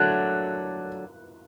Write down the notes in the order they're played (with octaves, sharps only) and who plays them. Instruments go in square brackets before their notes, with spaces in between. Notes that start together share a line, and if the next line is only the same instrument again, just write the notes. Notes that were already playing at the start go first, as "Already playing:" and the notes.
Already playing: [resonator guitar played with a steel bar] D3 F#3 A3 [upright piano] F#6